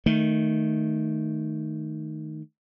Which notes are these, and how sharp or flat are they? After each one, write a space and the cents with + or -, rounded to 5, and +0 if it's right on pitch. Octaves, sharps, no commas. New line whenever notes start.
D#3 +0 A3 +0